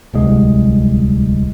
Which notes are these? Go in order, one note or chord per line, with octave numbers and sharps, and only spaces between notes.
D1 C2 G#3